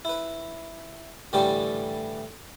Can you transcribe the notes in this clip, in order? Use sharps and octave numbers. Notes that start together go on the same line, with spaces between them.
E4 B4
A2 D3 E3 G3 A3 G4